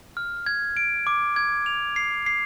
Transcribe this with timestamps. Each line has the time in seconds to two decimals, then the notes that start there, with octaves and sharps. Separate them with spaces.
0.17 F6
0.46 G#6
0.77 D7
1.07 D6
1.36 G#6
1.66 F7
1.96 C7
2.26 C7